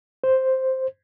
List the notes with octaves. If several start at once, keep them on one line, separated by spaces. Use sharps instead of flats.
C5